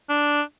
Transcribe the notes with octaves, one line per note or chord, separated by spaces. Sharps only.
D4